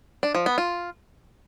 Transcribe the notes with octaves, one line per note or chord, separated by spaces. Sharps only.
D4
F3
B3
F4